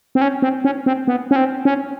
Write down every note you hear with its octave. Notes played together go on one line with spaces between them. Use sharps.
C4
C#4
C4
C#4
C4
B3
C#4
C4
C#4